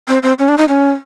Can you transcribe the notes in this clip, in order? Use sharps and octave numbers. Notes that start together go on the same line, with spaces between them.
C4
C4
C#4
D4
D#4
C#4